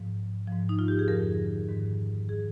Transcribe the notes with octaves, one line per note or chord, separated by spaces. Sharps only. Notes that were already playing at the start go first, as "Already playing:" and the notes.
Already playing: G#2 F3
G#2 F3
D#4
F4
G4
G#4
F2 D3 F3 A#4
G#2 D#3
D#3 G#4